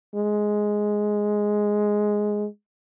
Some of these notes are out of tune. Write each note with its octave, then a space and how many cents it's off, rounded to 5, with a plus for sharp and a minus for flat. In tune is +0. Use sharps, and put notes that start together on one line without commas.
G#3 +5